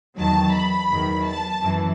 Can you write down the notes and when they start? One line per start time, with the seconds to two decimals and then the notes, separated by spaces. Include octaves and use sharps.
0.17 E2 D#3 F#3 A5
0.53 B5
0.89 E2 D#3 F#3
1.24 A5
1.60 F#2 E3